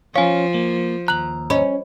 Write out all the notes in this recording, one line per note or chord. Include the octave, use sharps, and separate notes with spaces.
F3 C#4 F4 C#5 F5 G#5
A#3
D#2 A#5 F#6 F#7
C#4 D#5 B5